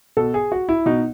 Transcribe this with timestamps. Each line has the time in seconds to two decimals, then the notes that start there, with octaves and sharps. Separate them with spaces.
0.17 B2 A4
0.34 G#4
0.52 F#4
0.69 E4
0.86 B2 D#4